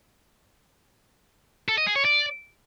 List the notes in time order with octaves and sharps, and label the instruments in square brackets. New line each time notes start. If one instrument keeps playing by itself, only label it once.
[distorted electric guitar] A4
D#5
G#4
C#5
D5